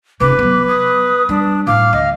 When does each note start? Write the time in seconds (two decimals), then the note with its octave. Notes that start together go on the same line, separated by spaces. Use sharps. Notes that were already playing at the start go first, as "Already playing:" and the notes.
0.20 F1 C#3 B4 D6
0.39 F#3 B3
0.68 D#6
1.29 G3 D4
1.67 A2 F5 D6
1.93 D2 D#5